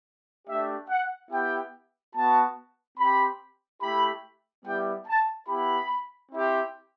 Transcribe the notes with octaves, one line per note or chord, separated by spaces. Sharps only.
A3 D4 G4 E5
F#5
B3 E4 G4 G5
B3 F#4 A5
C4 G4 B5
A3 E4 G4 B5
G3 B3 E4 G4 G5
A5
B3 E4 G4 B5
C4 E4 G4